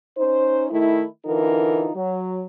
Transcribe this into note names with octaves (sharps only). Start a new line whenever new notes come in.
C#4 D#4 C5
D#3 A3 E4
D3 E3 D#4 F4 A#4
F#3